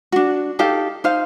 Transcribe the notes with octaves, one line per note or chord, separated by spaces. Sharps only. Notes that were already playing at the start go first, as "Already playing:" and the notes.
D4 F#4
D#4 G4 A4 F5
D#4 C5 F5